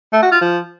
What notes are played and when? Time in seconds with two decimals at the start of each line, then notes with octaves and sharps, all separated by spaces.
0.13 A3
0.22 F#4
0.32 F4
0.41 F3